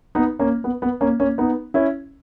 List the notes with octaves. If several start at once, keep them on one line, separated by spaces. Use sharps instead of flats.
B3 D#4
A#3 C#4
B3
B3
A#3 C#4
A#3 C#4
B3 D#4
C#4 E4